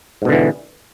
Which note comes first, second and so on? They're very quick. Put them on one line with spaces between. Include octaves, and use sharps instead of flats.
G#2 B2 D3 E3